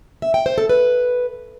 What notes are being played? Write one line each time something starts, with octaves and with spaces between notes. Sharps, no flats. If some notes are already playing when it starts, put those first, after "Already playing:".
E5
G5
C5
A4
B4